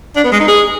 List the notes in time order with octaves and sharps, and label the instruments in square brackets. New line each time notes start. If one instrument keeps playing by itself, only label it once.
[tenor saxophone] D4
B3
G#3
D#4
G#4